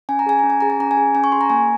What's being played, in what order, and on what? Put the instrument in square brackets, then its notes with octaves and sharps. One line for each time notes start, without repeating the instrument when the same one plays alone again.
[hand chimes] C#4 G#5
A#5
G#4 G#5
C#4 A#5
G#5
G#4 A#5
G#5
C#4 A#5
G#5
G#4
C#4 G#5
C#6
G#4 C6
A#5
A#3 G#5